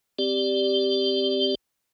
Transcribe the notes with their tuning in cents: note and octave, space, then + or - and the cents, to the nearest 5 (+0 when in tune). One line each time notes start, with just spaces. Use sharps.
C4 -5 G4 +0 D5 +0